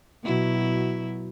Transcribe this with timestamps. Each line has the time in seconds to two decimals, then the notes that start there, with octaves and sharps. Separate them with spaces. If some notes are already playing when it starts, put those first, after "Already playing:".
0.24 B2 F#3 E4